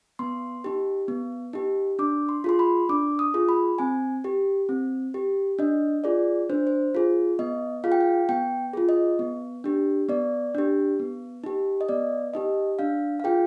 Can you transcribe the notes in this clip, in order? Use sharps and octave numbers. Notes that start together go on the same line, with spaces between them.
B3 C6
D#4 G4
B3
D#4 G4
D4 D6
C6
F4 G#4 C6
B5
D4 D6
D#6
F4 G#4
B5
C4 G#5
G4
C4
G4
D4 D#5
F4 G#4 D5
D4 C5
C5
F4 G#4
B3 D#5
F4 G#4 F5
G5
F5
B3 G5
F4 G#4
D#5
B3
D4 G4
B3 D5
D4 G4
B3
D#4 G4
D#5
B3 D5
D#4 G4 D#5
D4 F5
F5
F4 G#4 G5